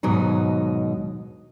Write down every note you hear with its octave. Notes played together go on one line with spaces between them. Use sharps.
D#2 G#2 B2 F#3 D#4